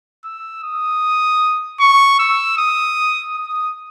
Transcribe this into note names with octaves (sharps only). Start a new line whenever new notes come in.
E6
D#6
C#6
E6
D#6
D#6